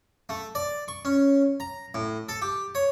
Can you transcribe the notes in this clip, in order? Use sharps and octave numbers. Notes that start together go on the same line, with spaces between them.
A3
D5
C#6
C#4
A#5
A2
A4
G4
C#5